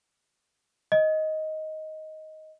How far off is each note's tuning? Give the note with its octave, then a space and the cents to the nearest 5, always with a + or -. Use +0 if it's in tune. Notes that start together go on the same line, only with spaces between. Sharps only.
D#5 +10